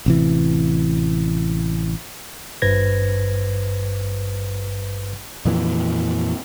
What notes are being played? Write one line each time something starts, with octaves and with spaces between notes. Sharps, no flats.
A1 C3 E3
G#1 G2 B4 C5 G#6 A#6
F2 A#2 E3